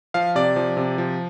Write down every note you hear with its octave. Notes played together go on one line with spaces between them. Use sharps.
F3 F5
C3 D5
F3
C3
F3